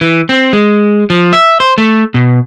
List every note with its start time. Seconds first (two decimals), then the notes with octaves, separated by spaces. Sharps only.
0.01 E3
0.29 C4
0.53 G#3
1.10 F3
1.33 E5
1.60 C5
1.78 A3
2.14 B2